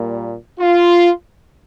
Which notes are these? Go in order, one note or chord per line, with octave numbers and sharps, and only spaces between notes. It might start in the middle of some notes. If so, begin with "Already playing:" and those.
Already playing: A#2 G3 A#3
F4